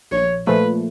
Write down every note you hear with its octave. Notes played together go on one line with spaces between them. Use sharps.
A#1 C#5
A#2 F3 A3 B4